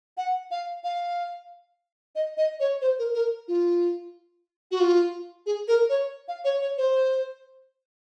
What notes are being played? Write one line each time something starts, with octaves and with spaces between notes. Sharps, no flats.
F#5
F5
F5
D#5
D#5
C#5
C5
A#4
A#4
F4
F#4
F4
G#4
A#4
C#5
F5
C#5
C#5
C5